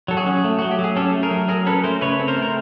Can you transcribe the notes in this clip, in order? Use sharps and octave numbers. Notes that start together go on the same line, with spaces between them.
F#3 A4
F#4 G#4
C#4
A3
F#3 F#4
G4
F#3 G#4
C#4 G4 A4
A3
G#4 A#4
F#3
F#3 G#4 A#4
C#4 A4 B4
A3 A#4 C5
C#3 B4 C#5
C4
A#4 C5
A3
A#4